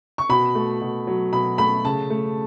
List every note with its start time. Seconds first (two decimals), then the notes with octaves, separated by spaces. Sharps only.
0.18 C#6
0.29 B2 B5
0.55 A3
0.81 B2
1.07 F#3
1.33 B2 B5
1.58 A3 B5
1.84 C#3 A5
2.10 A3